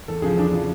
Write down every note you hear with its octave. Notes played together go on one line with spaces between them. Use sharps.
E2 A4
C#3 F3 G#4
E2 D4
C#3 F3